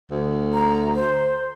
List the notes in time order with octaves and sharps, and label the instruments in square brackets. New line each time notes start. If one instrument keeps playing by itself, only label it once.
[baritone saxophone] D2
[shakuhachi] A#5
C5